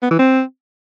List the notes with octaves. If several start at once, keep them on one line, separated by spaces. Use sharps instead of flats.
B3
E3
C4